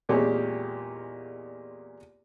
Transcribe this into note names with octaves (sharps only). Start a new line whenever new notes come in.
E2 A#2 G#3 C4 G4 C#5